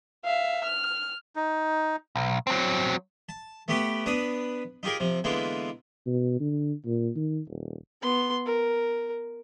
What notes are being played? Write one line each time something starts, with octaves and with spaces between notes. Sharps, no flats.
E5 F5
F6
D#4
B1
F#3 C4
A5
A3 B3 G4 B4 F#5 G5
B3 D4 B4 D#6
D#4 F4 G4 G#4 A#4
C3 F3
D3 E3 G#3 A#3 B3 F4
B2
D3
A#2
D#3
D#1
B3 C6
A#4